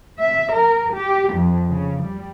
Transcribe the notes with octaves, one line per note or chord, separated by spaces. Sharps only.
E5
A#4
G4
F2
C#3
G3